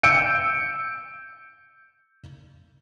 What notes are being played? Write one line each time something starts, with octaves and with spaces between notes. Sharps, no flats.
E6 G6 C#7 D7